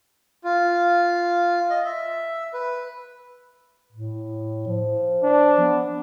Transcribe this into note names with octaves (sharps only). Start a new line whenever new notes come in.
F4
D#5
E5
B4
A2
F3
D4
B3